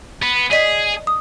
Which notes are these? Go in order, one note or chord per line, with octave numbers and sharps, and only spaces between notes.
B3
G#4 D5 D#5 B6
D#6